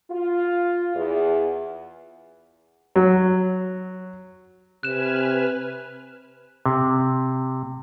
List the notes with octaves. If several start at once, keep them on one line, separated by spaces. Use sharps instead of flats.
F4
E2
F#3
C3 B4 G#5 F6 F#6 E7
C3